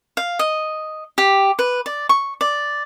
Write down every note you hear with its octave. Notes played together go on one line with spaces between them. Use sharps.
F5
D#5
G4
B4
D5
C#6
D5